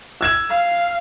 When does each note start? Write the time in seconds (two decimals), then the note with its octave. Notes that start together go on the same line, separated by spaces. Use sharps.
0.21 E6 G#6 E7
0.50 F5